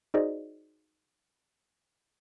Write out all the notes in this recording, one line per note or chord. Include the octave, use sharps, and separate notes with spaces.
D#4 F#4 G#4 C5 D5 D#5